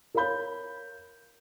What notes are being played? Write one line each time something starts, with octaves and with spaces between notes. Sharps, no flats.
A#4 C#5 F5 B5 G6